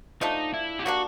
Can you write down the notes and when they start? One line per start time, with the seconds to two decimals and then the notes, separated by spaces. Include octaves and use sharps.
0.21 F3 A3 D4 D#4
0.54 E4
0.79 G4
0.85 G3 A#3 D4 F#4